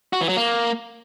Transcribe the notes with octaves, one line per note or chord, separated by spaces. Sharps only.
F#4
E3
F#3
A#3